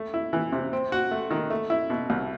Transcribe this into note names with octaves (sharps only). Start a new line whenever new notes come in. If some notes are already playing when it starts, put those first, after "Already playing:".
Already playing: A3
E4
E3
C3
C4
F#4
A3
D#3
A3
E4
B2
C2